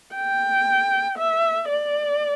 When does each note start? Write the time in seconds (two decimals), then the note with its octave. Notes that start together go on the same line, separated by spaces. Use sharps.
0.16 G5
1.18 E5
1.69 D5